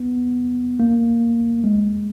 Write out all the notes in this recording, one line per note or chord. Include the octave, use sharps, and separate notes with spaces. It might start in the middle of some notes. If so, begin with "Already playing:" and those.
Already playing: B3
A#3
G#3